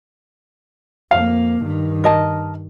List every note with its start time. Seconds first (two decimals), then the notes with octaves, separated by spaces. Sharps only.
1.11 F2 A#3 F5
1.62 G2 D#3
2.04 A#4 D#5 A5